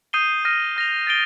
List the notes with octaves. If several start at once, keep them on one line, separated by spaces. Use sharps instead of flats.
D#6 G6 C7 D#7 G7
F6 A#6 D#7
F6 A#6 F7
A6 D7 G7